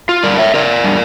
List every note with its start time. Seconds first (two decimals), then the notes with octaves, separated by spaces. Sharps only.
0.09 F4
0.24 G3 D4 A#4 D5
0.38 C#5 E5
0.54 D3 A#4 D5
0.84 G3 D4